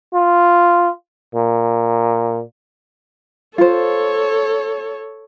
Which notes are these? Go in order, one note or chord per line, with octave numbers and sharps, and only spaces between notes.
F4
A#2
F4 A4 C5 C#5